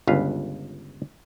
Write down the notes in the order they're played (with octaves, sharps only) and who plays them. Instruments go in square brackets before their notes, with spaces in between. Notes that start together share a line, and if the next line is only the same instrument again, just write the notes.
[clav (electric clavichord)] G1 C#2 B4 F5